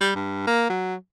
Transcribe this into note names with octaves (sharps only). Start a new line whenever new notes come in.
G3
G2
A#3
F#3